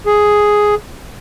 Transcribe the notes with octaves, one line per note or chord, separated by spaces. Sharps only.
G#4